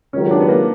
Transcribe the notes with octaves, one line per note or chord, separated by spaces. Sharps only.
C#2 C3 D#3 F#3 C#4
D4
B3
A#3